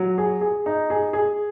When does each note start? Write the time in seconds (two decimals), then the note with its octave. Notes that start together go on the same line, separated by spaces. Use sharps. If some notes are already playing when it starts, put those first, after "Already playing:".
Already playing: F#3
0.18 G#4
0.41 G#4
0.66 D#4
0.90 G#4
1.13 G#4